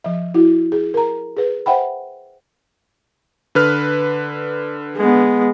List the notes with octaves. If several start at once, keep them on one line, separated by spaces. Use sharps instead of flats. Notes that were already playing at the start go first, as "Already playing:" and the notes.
F3 E5
E4 F#4
G#4
A#4 A#5
G#4 B4
C5 E5 F#5 G5 B5
D3 B4 F6
G#3 B3